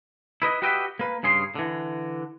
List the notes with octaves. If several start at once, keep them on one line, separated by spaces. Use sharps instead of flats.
E4 B4 D#5
F#4 G4 B4 D#5 E5 G5
A#3 B4
G2 C#3 G#4 C6
D3 E3